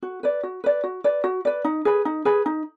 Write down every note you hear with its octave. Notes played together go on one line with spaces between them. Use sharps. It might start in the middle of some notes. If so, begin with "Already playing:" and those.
F#4
B4 D5
F#4
B4 D5
F#4
B4 D5
F#4
B4 D5
D#4
G#4 B4
D#4
G#4 B4
D#4